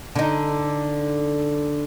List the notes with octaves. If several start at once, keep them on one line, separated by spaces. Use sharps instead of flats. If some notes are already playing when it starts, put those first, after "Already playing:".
D3 D#4